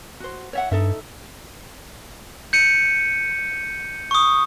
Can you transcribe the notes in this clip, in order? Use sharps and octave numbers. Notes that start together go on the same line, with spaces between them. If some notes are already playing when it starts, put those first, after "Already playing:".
F#4 C5
C#5 E5 F#5
G2 D#4 A4 E5
G6 C#7 D#7
C#6 D#6